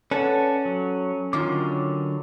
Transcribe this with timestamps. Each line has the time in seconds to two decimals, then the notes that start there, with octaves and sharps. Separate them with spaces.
0.11 C#4 A4 B4 D5 F#5
0.65 F#3
1.33 D3 D#3 F#3 A#3 F4 D6